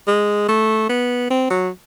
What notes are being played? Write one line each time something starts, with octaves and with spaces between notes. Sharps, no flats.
G#3
A3
B3
C4
F#3